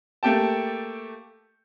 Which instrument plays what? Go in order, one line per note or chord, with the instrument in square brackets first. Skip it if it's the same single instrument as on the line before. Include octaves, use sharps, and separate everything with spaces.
[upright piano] A3 A#3 G4 G5 A5